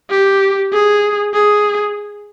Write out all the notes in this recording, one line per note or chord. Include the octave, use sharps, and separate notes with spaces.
G4
G#4
G#4